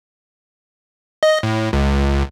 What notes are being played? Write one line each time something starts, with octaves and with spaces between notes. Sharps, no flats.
D#5
A2
C#2